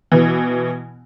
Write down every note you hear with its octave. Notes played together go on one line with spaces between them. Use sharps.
B2 E3